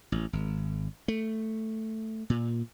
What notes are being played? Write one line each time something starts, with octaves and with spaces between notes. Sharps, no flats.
A1
G#1
A3
A#2